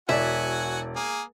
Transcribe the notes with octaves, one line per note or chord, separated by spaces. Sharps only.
E1 F#4 D5 E5 F#5 G#5
A#3 G#4